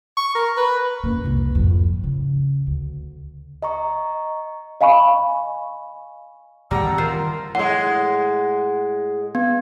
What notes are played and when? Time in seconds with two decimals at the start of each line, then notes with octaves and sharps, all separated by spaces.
0.17 C#6
0.35 A#4
0.57 B4
1.04 F#2 A#3
1.24 F1 C2
1.55 F2 G#2
2.04 C#3
2.67 D2
3.62 D#5 A#5 C#6
4.81 D#5 F5 G#5 B5 C#6
6.71 C#2 A2 G3 F#5 A5 A#5 E6
6.84 D#3 E3 C4
6.98 F4 A#4 C5
7.55 A2 G#3 F#5
9.35 B3